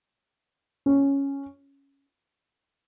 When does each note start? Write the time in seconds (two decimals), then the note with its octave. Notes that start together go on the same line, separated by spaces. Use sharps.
0.86 C#4